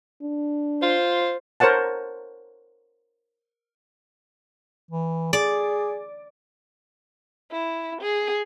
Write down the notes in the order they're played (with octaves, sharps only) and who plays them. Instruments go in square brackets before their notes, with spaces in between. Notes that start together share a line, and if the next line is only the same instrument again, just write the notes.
[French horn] D4
[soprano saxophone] F4 [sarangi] C5
[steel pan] A#4 C5 C#5 F#5 A5
[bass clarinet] E3
[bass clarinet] G#4 [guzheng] D5
[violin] E4
G#4